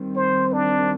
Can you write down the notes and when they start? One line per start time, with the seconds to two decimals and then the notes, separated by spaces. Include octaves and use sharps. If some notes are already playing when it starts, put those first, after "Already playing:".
Already playing: D#3 G3 C4
0.16 C5
0.53 D4